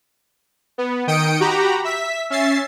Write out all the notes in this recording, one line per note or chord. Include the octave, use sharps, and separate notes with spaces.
B3
D#3 G5 D#6 C#7 D7
F#4 G4 A#5 B5
E5 B6
C#4 E5 A6 C7